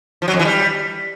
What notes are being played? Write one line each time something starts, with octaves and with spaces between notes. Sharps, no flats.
F3
F#3
F2
E3
G3